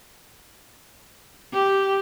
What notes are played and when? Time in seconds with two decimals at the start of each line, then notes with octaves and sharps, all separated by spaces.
1.52 G4